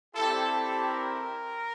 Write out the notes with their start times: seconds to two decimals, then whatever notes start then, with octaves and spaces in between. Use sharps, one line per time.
0.15 G3 C4 E4 G4 A4
0.52 A4
0.89 A#4